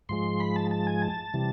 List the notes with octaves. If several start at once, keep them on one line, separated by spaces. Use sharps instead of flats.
G#2 F3 G#3 C6
B5
A5
A5
G#5
A5
C3 E3 G3